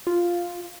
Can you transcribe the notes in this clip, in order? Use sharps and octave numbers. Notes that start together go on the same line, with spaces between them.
F4